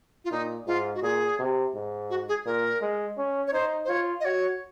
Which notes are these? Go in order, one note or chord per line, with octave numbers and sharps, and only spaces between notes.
F4
A#2 D#4
G#2 F4
F#4
A#2 G#4
C3
G#2
F#4
G#4
A#2 A#4
G#3
C#4
C#5
D#4 C5
C5
F4 C#5
D#5
F#4 C#5